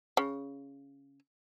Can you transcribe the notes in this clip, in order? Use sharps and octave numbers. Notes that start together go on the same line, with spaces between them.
C#3